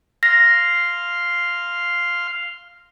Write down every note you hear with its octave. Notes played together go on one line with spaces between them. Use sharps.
F5 C6 F6 A#6